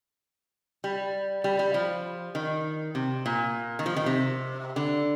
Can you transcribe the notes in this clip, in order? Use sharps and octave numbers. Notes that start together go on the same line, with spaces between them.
G3
G3
G3
F3
D#3
C3
A#2
D#3
F3
D#3
C3
D3